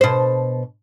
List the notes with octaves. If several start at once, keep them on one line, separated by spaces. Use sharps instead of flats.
B2 C5